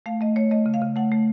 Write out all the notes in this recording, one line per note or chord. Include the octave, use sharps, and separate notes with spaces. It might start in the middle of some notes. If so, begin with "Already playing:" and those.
A3 F5
A3 D#5
A3 C#5
A3 D#5
C#3
F5
C#3
A3 F#5
A3